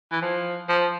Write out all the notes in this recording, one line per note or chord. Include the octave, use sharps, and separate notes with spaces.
E3
F3
F3